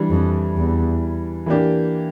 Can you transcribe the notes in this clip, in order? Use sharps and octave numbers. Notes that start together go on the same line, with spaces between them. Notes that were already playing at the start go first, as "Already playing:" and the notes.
Already playing: E3 G3 D4
F2
E2
E3 A#3 D4 G4